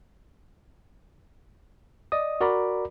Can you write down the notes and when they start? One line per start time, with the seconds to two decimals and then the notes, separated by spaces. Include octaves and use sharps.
2.12 D5 D#5 D#6
2.41 F#4 A#4 D5 A#5 B5 D6